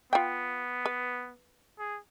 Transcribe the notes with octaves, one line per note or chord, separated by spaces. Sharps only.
B3 F4 G5
B4
G#4